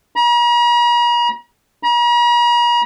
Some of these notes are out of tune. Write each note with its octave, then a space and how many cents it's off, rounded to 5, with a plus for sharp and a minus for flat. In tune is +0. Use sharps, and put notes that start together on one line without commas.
A#5 +45
A#5 +45